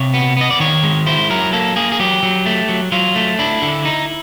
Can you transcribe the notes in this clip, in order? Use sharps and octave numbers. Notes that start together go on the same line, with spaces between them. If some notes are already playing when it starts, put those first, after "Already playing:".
Already playing: C3 C#5
B3
B3 D#5
D5
D#3 C#5
G#3
E4 C5
F#3 A#4
A#3 A4
A#3 G#4
G#4
F#3 G4
F#3
A3
F#3
F#3 F4
A3
D4 E4
D3
D#4